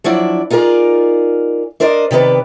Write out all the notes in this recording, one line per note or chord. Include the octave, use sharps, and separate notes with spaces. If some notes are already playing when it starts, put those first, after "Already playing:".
F3 F#3 D4 E4 D5
D#4 F4 G#4 A#4 D5
D4 A#4 C5 D5 D#5
C3 D#3 B3 B4 D5